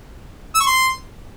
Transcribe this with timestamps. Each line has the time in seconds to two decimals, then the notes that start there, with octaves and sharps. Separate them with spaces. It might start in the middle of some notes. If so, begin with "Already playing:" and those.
0.55 E6
0.61 C#6
0.67 C6